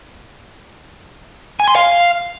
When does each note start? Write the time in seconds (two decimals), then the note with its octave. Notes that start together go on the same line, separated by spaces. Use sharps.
1.60 G#5
1.68 C6
1.76 F5